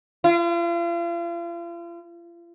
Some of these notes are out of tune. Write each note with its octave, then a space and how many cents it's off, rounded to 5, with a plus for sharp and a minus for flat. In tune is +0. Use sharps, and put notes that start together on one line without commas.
F4 -40